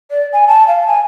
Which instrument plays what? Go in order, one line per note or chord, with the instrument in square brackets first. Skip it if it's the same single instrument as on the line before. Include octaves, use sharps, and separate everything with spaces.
[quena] D5
G#5
A5
F5
G#5